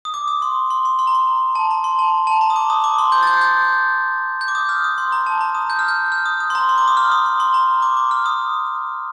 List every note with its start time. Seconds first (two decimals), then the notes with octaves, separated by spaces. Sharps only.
0.05 D#6
0.14 D6
0.28 D#6
0.42 C6
0.70 C6
0.85 C6
0.99 C6
1.07 A#5
1.15 C6
1.55 A5
1.71 A#5
1.84 C6
1.99 A5
2.27 A5
2.41 A#5
2.50 D#6
2.56 D6
2.70 D#6
2.84 D6
2.98 C6
3.12 G6
3.23 A6
3.27 G6
3.41 G6
4.41 G6
4.48 D6
4.55 D#6
4.69 F6
4.84 D#6
4.98 C6
5.12 A#5
5.26 A5
5.41 A#5
5.55 D#6
5.70 G6
5.79 F6
5.88 G6
6.12 F6
6.25 D#6
6.40 D#6
6.50 C6
6.55 A#5
6.69 C6
6.78 D6
6.88 D#6
6.97 F6
7.12 D#6
7.26 C6
7.40 C6
7.54 A#5
7.82 D6
7.97 D6
8.11 F6
8.26 D#6